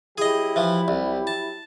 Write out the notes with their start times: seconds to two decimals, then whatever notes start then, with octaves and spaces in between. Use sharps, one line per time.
0.18 F#3 E4 G4 G#4 D#5
0.56 E3 F3
0.88 C2
1.27 A5